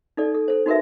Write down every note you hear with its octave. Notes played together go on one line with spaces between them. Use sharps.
D#4 A4 D5
A4
A4 C5
D#4 F#4 A#4 B4 E5